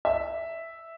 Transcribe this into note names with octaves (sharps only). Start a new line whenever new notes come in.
E5